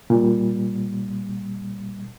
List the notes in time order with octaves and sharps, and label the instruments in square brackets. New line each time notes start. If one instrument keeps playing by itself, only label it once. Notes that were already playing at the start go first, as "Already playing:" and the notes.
[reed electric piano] A#2 G3